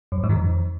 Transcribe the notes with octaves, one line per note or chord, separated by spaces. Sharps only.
F#2
F2
G#2
D#3
F2